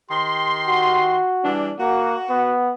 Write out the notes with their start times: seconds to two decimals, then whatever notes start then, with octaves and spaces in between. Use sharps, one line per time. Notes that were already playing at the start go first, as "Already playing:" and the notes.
0.10 D#3 G4 C6
0.67 F#4
1.44 E3 G3 D4
1.80 A#3 F#4
2.30 B3